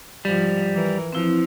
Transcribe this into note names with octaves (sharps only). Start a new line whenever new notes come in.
G#2 F3 G3
E3 A#4
F3 C4 E4 F4